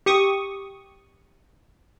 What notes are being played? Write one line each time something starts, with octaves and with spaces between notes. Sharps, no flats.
G4 C#6 D#6